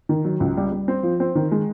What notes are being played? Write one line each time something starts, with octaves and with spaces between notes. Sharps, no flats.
D#3
F#3
C#2
G3
G3
C4
F3
C4
D#3
G#3